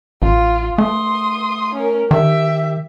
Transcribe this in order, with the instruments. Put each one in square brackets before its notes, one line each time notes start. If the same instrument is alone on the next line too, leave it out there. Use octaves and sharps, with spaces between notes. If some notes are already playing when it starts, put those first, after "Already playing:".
[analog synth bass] A1 [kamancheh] F4
[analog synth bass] A3 [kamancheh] C6 D#6
[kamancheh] C#4 A#4
[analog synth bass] D#3 [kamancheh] G4 E5